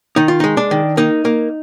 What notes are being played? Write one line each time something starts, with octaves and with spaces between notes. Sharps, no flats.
D#3 D#4
F4
G#3 D#4
D4
D#3
A#3 D#4
A#3